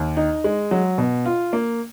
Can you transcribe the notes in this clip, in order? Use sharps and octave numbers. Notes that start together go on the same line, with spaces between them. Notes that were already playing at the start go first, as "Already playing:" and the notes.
Already playing: D#2
D#4
G#3
F#3
B2
F4
A#3